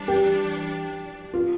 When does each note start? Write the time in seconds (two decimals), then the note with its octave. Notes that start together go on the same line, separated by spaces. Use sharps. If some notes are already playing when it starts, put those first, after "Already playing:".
Already playing: E3 G3 D4
0.08 G4
1.34 F4